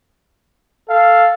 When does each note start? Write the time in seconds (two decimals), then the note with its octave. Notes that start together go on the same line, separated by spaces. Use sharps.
0.89 A4 F5